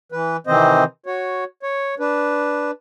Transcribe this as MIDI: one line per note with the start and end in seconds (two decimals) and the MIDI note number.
0.12 0.37 52
0.12 0.37 71
0.47 0.84 48
0.47 0.84 51
0.47 0.84 52
0.47 0.84 60
0.47 0.84 72
0.47 0.84 75
1.06 1.44 66
1.06 1.44 73
1.63 1.95 73
1.99 2.71 62
1.99 2.71 71